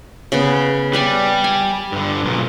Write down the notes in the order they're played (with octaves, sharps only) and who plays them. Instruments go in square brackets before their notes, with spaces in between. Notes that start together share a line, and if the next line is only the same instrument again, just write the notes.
[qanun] C#3 B3
[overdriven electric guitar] G3 [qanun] B4 D5 G#5
[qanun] G#5
[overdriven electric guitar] G2 D3
B1 A#2